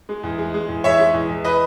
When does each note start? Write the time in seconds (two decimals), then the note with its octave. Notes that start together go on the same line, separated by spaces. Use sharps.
0.09 G#3
0.23 E2
0.39 G#3
0.54 G#3
0.69 E2
0.84 E2 C#5 E5
0.99 G#3
1.14 E2
1.29 E2
1.44 B4 D#5